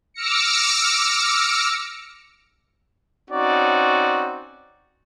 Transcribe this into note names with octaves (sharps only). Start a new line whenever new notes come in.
D6 E6 F6 A#6 C#7
C4 C#4 D#4 F#4 D5